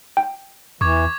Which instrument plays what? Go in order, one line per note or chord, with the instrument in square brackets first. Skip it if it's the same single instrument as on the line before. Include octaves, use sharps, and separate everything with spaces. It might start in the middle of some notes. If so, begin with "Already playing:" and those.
[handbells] G5
[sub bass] E2 [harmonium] E3 [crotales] C#6 D6 G#6